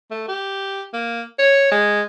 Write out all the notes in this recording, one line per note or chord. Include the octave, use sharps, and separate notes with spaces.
A3
G4
A#3
C#5
G#3